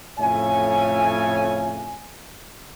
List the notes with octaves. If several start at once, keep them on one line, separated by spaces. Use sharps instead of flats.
F2 A2 C#3 C#5 E5 G#5